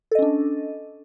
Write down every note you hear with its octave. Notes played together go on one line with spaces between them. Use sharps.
C#4 D4 A4 D#5